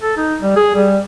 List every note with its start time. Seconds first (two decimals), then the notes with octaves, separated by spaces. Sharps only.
0.02 A4
0.17 D#4
0.41 G3
0.56 G#4
0.75 G3